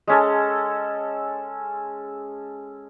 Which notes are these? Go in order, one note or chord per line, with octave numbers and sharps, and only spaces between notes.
G#3 C#4 A4